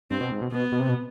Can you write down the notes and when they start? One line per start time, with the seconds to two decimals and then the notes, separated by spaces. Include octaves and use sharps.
0.11 G2 C4
0.21 B2
0.31 G#2
0.41 B2
0.52 B2 B3
0.72 B2
0.80 C3
0.89 B2